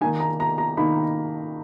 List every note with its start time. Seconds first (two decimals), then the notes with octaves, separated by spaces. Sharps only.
0.01 D#3 A#3 D#4 G#5
0.20 A#5
0.40 A#5
0.58 A#5
0.77 D#3 A#3 D#4 B5